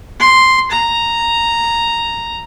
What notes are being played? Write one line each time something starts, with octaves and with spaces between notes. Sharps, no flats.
C6
A#5